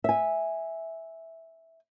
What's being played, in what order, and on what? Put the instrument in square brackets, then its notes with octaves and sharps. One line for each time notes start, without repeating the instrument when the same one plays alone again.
[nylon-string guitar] E5 G#5